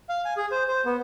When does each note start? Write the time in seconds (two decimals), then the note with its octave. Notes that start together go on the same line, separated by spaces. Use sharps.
0.09 F5
0.25 G#5
0.37 G#4
0.52 C5
0.68 C5
0.85 B3